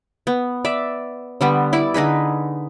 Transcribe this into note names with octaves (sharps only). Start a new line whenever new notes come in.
B3
D5 E5
D3 G3 B3
E4 D5
D3 D#4 G#4 B4